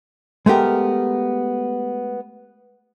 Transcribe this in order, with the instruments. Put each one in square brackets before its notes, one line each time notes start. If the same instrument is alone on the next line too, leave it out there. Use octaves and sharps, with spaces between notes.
[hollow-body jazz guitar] G#3 A3 B3 G4 A#4